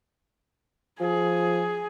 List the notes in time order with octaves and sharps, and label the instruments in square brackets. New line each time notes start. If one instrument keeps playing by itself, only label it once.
[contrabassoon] F3 [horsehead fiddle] G#4